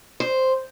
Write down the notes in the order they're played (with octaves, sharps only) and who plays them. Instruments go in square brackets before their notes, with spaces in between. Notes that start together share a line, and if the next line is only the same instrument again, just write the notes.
[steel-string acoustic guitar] C5